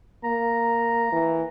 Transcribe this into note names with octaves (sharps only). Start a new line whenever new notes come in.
A#3 A#5
E3